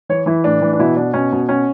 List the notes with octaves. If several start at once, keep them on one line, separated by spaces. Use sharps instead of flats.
E3 C#5
E3 E4
A2 D4
E3
D4
B2 E4
B2 D4
B2 C#4
B2
B2 C#4